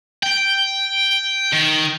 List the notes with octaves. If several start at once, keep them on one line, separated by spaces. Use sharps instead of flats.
G5
D#3